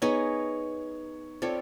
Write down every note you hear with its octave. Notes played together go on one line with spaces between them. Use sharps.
B3 D#4 G#4 C#5
C4 F4 A4 C#5 D5